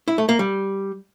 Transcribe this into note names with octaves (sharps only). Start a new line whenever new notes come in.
E4
A3
A#3
G3